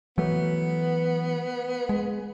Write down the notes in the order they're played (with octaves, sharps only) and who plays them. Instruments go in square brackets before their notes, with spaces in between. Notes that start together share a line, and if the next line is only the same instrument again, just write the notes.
[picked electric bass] E3 F#3 A3 [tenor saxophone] B3
[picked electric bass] G#3